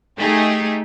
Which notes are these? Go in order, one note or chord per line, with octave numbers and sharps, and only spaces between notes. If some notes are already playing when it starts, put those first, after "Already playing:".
A3 D#4 G4 G#4